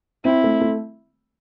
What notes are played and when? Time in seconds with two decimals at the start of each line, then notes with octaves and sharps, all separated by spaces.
0.25 C4 E4
0.44 A3
0.61 A3